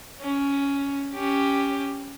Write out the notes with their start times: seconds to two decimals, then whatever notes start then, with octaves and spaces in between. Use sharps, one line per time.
0.21 C#4
1.13 C#4 G4